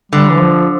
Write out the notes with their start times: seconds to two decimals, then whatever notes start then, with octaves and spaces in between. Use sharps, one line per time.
0.12 D3 G3
0.30 E3
0.39 F3